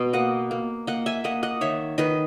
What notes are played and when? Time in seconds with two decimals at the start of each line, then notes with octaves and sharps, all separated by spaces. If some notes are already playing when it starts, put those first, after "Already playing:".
Already playing: B2
0.13 A#3 D#5 F#5
0.51 A#3
0.87 A#3 D#5 F#5
1.06 E5 G#5
1.24 A#3 D#5 F#5
1.43 D#5 F#5
1.61 D#3 C#5 E5
1.98 D#3 B4 D#5